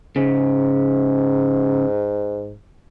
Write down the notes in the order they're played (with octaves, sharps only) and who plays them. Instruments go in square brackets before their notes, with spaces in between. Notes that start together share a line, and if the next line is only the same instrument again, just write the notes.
[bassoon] G#2 [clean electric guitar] C#3